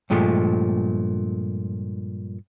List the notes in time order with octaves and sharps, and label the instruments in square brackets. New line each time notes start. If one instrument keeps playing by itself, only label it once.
[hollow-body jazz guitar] G2 A#2 F3 G#3 A3